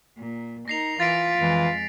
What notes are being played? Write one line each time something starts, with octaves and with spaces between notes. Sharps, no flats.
A#2
D#4 A#4 A#6 C7 F7
E3 F4 A6 B6 D7
F2 E3 G#3